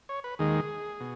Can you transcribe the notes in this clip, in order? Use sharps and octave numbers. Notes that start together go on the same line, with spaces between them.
C#5
B4
D#2 D#3 G#3 G#4
B2